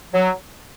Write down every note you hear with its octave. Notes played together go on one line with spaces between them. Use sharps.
F#3